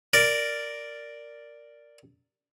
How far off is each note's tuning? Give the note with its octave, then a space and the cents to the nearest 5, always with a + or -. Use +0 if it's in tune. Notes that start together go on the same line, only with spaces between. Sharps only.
A#4 -5 D5 +0